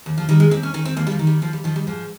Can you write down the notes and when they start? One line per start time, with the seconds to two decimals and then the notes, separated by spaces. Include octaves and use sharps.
0.06 D#2
0.18 F3
0.29 D#3 G3
0.40 G#3
0.51 D#2 C4
0.63 C#4
0.74 D#3 C#4
0.85 C4
0.96 D#2 A#3
1.07 G3
1.12 F3
1.19 D#3
1.27 G3
1.42 D#2 F3
1.53 G3
1.64 D#3 F3
1.76 G3
1.87 G#2 F3